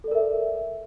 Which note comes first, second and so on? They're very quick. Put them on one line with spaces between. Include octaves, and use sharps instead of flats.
A4 D5 A#4 E5